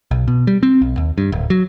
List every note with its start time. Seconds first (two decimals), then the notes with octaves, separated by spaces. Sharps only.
0.11 B1
0.28 B2
0.47 G3
0.63 C4
0.82 B1
0.97 D#2
1.18 G2
1.32 D1
1.50 F#3